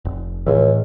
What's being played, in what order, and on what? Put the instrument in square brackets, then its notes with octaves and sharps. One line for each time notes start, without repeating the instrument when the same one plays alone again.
[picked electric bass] F1
[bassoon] C#2 [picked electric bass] A2 E3